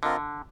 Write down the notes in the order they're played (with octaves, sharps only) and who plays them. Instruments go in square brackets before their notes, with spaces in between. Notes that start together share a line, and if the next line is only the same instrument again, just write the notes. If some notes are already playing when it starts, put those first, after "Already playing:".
[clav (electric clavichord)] D3 [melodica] C4 F4 A#4 D#5